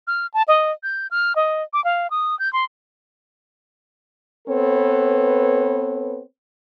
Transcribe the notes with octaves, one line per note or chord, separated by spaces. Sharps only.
F6
A5
D#5
G6
F6
D#5
D6
F5
D#6
G6
C6
B3 C4 A4 B4 C#5